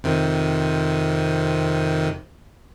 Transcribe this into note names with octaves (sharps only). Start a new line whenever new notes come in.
F2 C3 D#3